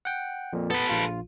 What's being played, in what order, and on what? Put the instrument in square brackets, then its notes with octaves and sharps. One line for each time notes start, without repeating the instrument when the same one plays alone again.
[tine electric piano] F#5 G5
F2 A#2
[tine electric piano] B3 [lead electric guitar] A4 B4
[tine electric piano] A#1 F4